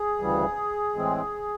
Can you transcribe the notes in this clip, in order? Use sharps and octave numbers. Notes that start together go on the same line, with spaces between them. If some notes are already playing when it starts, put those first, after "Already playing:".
Already playing: G#4
D2 C#3 E3 G3
A2 E3 G#3 C4